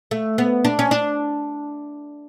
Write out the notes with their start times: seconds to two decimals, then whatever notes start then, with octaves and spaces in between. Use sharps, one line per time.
0.11 A3
0.38 B3
0.65 D4
0.79 C#4
0.91 D4